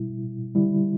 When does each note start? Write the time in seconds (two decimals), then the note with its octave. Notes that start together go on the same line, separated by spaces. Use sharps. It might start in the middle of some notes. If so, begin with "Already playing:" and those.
Already playing: B2 G3 E4
0.55 D3 G3 E4